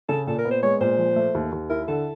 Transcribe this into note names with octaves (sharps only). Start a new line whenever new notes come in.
C#3 A4
A#2 A4
A#4
B3
C5
G#3 C#5
A#2 C5
F3
A3
D#2
D#2
E4 A#4
D3 A4